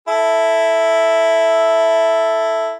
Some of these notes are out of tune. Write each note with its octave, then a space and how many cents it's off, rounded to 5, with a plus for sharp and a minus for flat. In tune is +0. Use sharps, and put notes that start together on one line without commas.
E4 +0 A4 +0